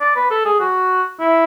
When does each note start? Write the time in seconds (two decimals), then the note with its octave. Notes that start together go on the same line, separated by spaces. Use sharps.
0.01 D5
0.16 B4
0.31 A4
0.45 G#4
0.60 F#4
1.20 E4